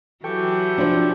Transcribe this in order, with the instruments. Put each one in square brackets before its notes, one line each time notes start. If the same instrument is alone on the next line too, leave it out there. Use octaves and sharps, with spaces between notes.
[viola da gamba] E3 F#3 [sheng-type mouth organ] G4 C#6 [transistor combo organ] A4 G5
[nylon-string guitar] F3 D4